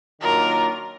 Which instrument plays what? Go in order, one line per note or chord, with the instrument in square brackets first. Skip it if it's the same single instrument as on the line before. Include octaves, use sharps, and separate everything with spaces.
[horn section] D#3 F#3 A#3 D4 F4 [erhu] A#4